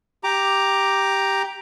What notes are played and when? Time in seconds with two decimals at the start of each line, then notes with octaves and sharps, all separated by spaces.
0.24 G4 A#5 D6